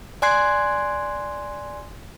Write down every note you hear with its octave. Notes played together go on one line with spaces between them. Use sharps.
D5 G#5 C6 F#6 G#6 C7